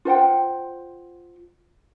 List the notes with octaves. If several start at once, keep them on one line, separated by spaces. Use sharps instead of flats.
F4 C5 F#5 G5